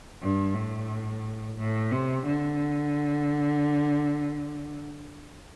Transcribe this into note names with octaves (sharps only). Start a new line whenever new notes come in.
G2
A2
A2
C3
D3